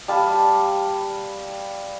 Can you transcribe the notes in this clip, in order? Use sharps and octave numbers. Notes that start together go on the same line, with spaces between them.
G3 F5 A5 B5